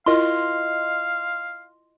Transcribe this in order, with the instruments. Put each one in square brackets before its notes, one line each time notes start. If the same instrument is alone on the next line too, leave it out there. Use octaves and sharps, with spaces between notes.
[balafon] E4 F4 A#4 [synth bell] D#5 C6 [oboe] F5